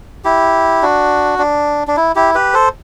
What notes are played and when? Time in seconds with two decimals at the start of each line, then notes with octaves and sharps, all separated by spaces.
0.25 E4 G4
0.82 D4 F#4
1.39 D4
1.88 D4
1.97 E4
2.15 E4 G4
2.35 G4 B4
2.54 A4 C5